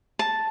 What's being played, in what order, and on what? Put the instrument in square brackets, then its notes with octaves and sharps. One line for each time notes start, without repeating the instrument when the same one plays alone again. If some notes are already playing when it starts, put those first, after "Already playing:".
[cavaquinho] A5